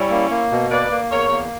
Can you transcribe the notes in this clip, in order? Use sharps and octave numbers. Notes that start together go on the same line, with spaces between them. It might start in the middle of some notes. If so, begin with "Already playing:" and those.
Already playing: G3 C#4 E4
A#3
A#3
B2
A#3 B4 D5
A#3
E2 A#4 C#5
A#3